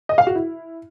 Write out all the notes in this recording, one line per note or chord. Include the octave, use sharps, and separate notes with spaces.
D#5
F5
F#4
E4